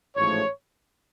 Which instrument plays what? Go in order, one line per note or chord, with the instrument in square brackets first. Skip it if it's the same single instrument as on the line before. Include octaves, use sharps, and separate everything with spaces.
[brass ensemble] A1 G#2 F3 A3 C#5